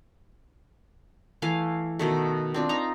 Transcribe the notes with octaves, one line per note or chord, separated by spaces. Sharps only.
E3 A3 F5 G#5
B2 D#3 A3
C4 D4 F4
D#4 A#5